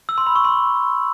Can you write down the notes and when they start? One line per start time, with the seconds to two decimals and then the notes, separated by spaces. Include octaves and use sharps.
0.09 E6
0.18 C6
0.27 B5
0.36 C#6
0.44 C6